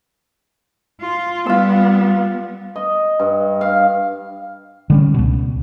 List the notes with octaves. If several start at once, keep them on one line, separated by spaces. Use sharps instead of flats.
F4
G3 B3 F4 E6
D#5
G2
F5
D3 G3 C#4
C#2 B2